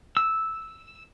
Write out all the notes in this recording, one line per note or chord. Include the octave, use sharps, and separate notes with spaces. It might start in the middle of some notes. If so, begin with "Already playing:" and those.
E6